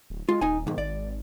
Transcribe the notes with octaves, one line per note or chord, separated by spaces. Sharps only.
D1
G#3 F4
D#1 D#4 G#5
B1 G#2 D#3
G#1 D5